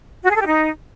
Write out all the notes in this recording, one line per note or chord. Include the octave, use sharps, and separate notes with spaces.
F#4
G#4
A4
G4
D#4